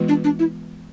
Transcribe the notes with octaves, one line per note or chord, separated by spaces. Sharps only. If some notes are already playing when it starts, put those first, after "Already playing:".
Already playing: E3 G#3 B3 F4 B4
D4
D4
E4